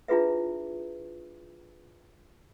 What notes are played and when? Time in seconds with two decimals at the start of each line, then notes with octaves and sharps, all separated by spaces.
0.08 D4 E4 F4 G#4 B4 E5